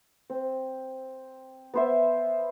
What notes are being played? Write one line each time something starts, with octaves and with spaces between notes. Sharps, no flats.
C4
B3 C5 E5